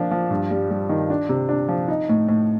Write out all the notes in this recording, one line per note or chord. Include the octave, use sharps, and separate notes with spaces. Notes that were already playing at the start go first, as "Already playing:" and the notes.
Already playing: F3 A#3 D4
F3
G2
G3
G3
D#3
D4
C3
D4
F3
D#4
A2
A2